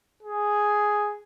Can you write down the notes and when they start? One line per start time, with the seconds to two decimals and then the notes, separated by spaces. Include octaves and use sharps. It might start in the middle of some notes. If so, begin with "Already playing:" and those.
0.23 G#4